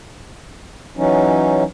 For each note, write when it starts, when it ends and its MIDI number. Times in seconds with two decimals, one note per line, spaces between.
0.97 1.63 52
0.97 1.63 54
0.97 1.63 61
0.97 1.63 63